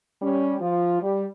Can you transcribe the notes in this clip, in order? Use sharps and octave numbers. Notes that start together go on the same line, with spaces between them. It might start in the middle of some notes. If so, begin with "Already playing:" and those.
G3 C#4
F3 F4
G3